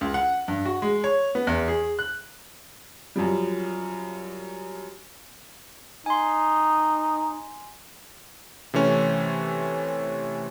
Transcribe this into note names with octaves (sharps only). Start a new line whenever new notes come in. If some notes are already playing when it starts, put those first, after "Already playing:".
C#2
F#5
G2
F#4
G#3
C#5
B3
E2
G#4
F#6
F#2 F3 G3
D#4 G#5 C6
C3 E3 A3 C#4